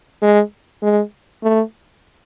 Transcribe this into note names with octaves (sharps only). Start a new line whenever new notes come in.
G#3
G#3
A3